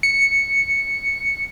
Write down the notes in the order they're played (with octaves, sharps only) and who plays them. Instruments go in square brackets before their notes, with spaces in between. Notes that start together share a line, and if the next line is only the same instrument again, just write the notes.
[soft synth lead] C#7